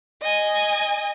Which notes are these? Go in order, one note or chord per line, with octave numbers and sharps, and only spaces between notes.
D#5 G#5